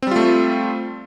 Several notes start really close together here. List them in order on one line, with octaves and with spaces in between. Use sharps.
C4 G3 F4 A3